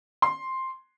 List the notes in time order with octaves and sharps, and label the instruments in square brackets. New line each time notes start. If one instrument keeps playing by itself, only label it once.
[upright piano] C6